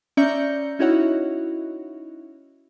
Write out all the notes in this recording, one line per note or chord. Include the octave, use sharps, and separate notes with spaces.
C#4 D5 E5 A#5 G6 C#7
C#4 D#4 E4 F#4 C#5 F#5